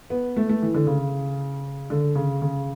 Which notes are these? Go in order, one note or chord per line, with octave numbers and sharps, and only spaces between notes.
B3
A3
A3
E3
D3
C#3
D3
C#3
C#3